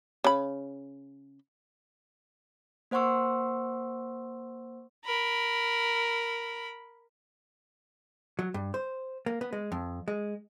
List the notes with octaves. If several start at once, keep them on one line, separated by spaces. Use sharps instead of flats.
C#3 B5
A#3 C5 F#5 C6 C#6 E6
A#4 B5
F#3
G2
C5
A#3
B3
G#3
F2
G#3